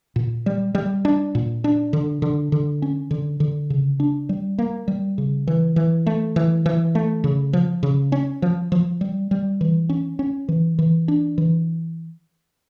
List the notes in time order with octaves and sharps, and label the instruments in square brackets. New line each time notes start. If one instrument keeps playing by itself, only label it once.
[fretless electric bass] A#2
G3
G3
D4
A#2
D4
D3
D3
D3
C#4
D3
D3
C#3
D4
G3
A#3
G3
C#3
E3
E3
A3
E3
E3
A3
C#3
F3
C#3
C#4
F3
F3
G3
G3
E3
C#4
C#4
E3
E3
D4
E3